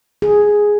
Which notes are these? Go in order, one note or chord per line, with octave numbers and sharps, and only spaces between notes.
G#4